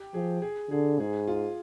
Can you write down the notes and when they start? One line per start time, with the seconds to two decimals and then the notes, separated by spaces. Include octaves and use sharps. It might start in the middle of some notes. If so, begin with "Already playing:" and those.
Already playing: G4
0.14 F3 G#4
0.42 G#4
0.71 D3 G#4
0.99 G#2 G#4
1.28 F4